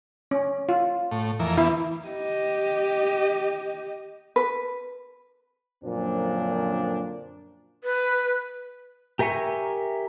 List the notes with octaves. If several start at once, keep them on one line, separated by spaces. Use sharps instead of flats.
C#4
F4
A2
F2 E3 A#4
E3 B3 E4
G4 D#5
B4
F#2 A#2 D3 F3 C4 D4
B4
G4 A#4 E5 G#5 C#6